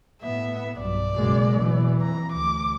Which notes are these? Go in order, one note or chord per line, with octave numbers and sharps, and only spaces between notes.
A2 B3 E5
B1 G2 D5
F#1 F#2 B2 G#3
B2 E3
F2 A#5
D2 D6